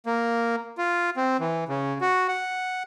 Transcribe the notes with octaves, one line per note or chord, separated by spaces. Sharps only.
A#3
F4
C4
E3
C#3
F#4
F#5